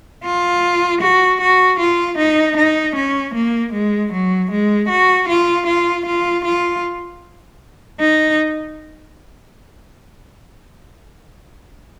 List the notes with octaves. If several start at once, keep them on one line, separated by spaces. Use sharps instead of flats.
F4
F#4
F#4
F4
D#4
D#4
C#4
A#3
G#3
F#3
G#3
F#4
F4
F4
F4
F4
D#4